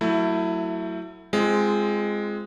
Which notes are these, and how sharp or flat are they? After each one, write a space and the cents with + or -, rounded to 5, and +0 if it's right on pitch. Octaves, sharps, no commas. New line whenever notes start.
F#3 +0 A3 +25 E4 +5
G#3 +0 C4 +0 F4 -25